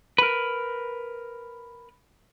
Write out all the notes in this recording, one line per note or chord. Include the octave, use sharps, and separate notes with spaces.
A#4 B4